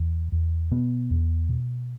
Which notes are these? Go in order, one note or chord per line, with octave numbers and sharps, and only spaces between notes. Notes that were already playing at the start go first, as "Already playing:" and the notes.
Already playing: E2
E2
B2 B3
E2
B2